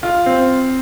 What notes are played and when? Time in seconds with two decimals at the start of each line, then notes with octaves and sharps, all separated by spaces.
0.03 F4
0.26 C4